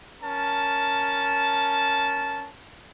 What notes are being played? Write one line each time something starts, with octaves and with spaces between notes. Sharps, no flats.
C#4 A#4 A5